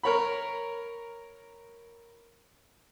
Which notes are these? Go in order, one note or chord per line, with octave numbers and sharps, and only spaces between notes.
A#4 C#5 B5